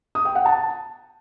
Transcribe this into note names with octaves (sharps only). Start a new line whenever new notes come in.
D#6
G5
F#5
A5